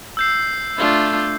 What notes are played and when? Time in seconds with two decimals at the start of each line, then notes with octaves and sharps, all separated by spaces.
0.17 E6 G6 C7
0.77 A3 D4 F4